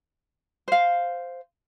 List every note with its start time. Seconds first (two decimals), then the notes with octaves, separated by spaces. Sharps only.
0.68 C5 F5